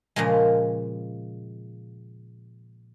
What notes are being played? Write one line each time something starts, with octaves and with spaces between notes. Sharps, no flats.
A#2 C#3 F3 G#3